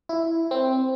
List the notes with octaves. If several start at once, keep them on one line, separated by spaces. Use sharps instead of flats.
E4
C4